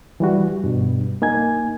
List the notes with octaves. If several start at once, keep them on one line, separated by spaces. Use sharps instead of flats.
E3 G3 F#4
G2 B2
A#3 D#4 G#5 G#6